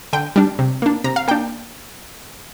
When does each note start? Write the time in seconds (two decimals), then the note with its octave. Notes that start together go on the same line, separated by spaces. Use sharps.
0.13 D3 G5
0.36 G3 D4
0.59 C3
0.82 A#3 D4
1.04 C3 A#5
1.16 F5
1.28 A#3 D4 G5